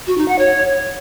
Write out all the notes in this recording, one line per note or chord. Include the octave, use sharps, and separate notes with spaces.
F#4
D#4
F#5
C#5